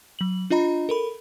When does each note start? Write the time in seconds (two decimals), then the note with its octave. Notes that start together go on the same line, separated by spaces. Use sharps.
0.19 F#3 F#7
0.50 D4 F4 D#5 A#5 B5
0.89 A4 A#4 B5